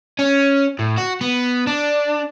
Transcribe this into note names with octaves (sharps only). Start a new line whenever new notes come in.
C#4
A2
F#4
B3
D4